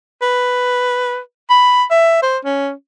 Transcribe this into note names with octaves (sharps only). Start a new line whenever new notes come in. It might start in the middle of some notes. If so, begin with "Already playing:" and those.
B4
B5
E5
C5
C#4